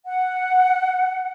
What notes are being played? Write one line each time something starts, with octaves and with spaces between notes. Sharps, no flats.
F#5